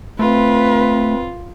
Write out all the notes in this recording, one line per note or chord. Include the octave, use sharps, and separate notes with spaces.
A3 C4 F4 B4